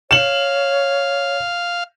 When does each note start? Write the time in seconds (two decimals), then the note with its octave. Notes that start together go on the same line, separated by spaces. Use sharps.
0.11 C#5 F5 E7 F#7